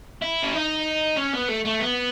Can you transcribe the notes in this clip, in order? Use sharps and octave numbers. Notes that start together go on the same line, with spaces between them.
E4
C#4
D#4
C#4
B3
A3
A3
B3